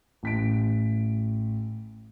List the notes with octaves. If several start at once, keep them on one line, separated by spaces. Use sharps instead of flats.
A1 B6 D7